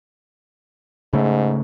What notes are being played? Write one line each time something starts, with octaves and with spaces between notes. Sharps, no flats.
G#2 C#3 A3